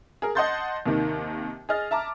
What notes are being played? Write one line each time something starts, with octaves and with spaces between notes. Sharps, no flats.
G#4 A#4
D#5 F#5 A5 C6 G6 A6
D#2 C3 D#3
G#4 D#5 F6 A6
E5 A5 A#5 D6